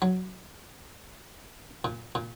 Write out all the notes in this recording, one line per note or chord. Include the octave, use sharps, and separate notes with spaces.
F#3
A#2
A#2